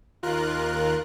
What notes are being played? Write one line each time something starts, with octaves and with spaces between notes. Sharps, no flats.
D#2 F4 A#4 F#6